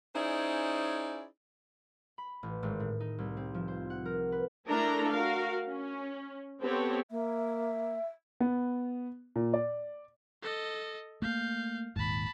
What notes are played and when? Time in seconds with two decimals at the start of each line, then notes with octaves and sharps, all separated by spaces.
0.15 C#4 D#4 E4 G#4 C5 D5
2.18 B5
2.43 A1
2.63 G#1
2.80 A2
3.00 D#4
3.18 C2
3.37 C4
3.54 F3
3.68 C5
3.90 F#5
4.05 A#4
4.32 B4
4.68 A3 D4 E4 A4 A#4 A#5
5.10 F#4 A#4 F5
5.67 C#4
6.61 B3 C4 G4 A4 C#5
7.11 A#3 E5
8.40 B3
9.36 A#2
9.54 D5
10.43 A4 D#5
11.22 A3 A#3 F5 G6
11.96 D#1 D#2 G#2 A5 B5